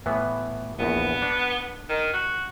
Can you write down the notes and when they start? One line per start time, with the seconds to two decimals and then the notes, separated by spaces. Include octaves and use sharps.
0.06 A2 E3 B3
0.79 A#1 E2 B3
1.22 D4
1.89 D#3
2.13 F#4